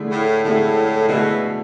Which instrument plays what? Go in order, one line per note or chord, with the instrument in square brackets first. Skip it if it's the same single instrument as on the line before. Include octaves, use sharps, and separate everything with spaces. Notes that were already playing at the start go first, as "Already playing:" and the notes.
Already playing: [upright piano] D3 A3 E4 G#4
[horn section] A2
[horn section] A2 [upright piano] D3 A3 E4 G#4
[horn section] B2 [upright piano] D3 A3 E4 G#4